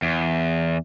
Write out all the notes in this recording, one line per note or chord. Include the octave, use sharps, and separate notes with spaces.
E2